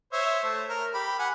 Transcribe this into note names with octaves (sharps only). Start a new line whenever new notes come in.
C5 C#5 E5
A3
A#4
G4 B5
F#5 G#5